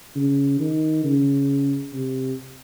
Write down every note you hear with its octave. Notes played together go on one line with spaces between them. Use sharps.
C#3
D#3
C#3
C3